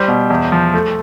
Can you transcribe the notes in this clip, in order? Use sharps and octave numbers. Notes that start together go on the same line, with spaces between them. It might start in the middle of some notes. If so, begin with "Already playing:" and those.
Already playing: G3 C5
B2
E2
F3
A3